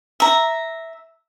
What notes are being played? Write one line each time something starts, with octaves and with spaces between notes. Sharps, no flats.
E5 A#5